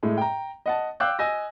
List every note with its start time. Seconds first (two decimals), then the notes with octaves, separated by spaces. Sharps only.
0.03 A2 G#3
0.18 G5 A#5
0.66 D#5 F#5 A5
1.00 F5 G5 D6 E6 F#6 G6
1.19 D#5 G#5 E6 A#6